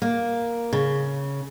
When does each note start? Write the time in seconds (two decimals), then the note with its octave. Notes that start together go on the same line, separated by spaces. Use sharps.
0.02 A#3
0.73 C#3